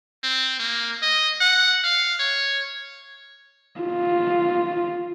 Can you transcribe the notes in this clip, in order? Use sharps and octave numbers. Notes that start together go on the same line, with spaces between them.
C4
A#3
D#5
F#5
F5
C#5
F4